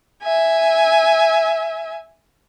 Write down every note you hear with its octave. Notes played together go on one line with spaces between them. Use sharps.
E5 G#5